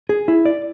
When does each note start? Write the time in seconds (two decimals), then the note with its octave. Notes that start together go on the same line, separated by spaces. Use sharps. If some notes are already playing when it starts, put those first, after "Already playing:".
0.09 G#4
0.28 E4
0.45 D5